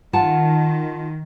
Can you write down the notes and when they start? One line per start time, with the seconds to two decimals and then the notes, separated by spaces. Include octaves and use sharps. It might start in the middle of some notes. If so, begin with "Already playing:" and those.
0.13 D#3 F4 F#5 A5